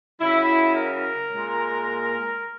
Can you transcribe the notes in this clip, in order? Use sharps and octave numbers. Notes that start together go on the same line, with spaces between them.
C#3 F#3 E4
A#4
A#2 G#3